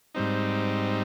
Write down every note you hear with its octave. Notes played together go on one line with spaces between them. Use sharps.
G#2 G3 C4 D#4